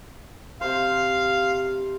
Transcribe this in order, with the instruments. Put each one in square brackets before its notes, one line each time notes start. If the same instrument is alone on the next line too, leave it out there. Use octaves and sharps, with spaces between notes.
[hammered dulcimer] C3 C5 [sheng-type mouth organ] F5